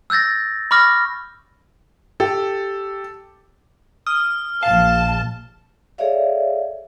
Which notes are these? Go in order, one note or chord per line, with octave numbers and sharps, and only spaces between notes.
E6 F#6 G6 A6 A#6
B5 C#6 D6 F6 A#6
G4 A4
D#6 F6
A#1 F5 A5 E7
G#4 A4 C#5 D5 E5 F5